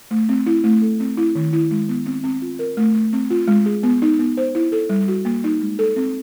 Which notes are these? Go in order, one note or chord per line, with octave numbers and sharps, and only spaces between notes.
A3
C4
E4
A3
A4
C4
E4
D#3
E4
G#3
B3
C4
C4
F4
A#4
A3
A3
C4
F4
G#3
G#4
B3
D#4
B3
C5
E4
A4
G3
F#4
A#3
D#4
G#3
A4
C4